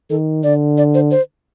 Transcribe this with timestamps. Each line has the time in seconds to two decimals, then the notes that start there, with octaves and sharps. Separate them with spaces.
0.10 D#3 A4
0.43 D3 D5
0.78 D5
0.94 C5
1.11 C5